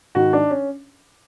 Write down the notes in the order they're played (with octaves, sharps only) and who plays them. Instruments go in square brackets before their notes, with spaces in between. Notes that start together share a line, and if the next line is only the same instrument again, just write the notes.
[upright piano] G#2 D#3 F#4
D4
C#4